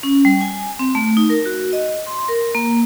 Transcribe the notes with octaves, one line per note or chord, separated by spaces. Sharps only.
C#4
G3
G#5
C4
A3
D#4
A#4
F#4
D#5
C6
A#4
A#3